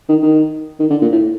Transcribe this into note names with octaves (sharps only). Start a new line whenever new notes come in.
D#3
D#3
D#3
D3
A#2
A2